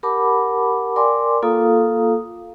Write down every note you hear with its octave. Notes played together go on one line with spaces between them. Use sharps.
G4 A#4 F#5 A5 B5 D6
A#4 D5 G5 G#5 C6 D6
A#3 F4 A4 F5 A#5 D#6